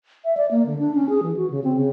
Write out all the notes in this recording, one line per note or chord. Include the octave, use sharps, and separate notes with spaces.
E5
D5
A#3
D3
D4
C#4
G#4
E3
F#4
C#3
C4
C#3